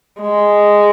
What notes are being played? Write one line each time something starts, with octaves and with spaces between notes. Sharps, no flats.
G#3